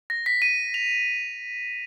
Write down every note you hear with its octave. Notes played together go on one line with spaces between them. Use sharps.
A#6
B6
D#7
F7